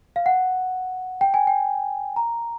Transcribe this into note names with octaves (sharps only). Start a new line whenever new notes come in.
F5
F#5
G5
G#5
G5
A#5